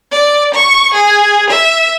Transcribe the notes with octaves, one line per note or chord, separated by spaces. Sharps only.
D5
C#6
G#4
E5